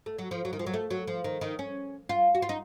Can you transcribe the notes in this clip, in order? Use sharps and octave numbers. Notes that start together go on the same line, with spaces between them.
A3
F#3
F3
F#3
D#3
F3
F#3
A3
F#3
F3
D#3
D#3
C#4
F4
F#4
F4
D#4